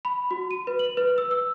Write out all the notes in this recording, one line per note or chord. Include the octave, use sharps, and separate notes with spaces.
B5
F#4
D#7
B4
F#7
B4
E6
E6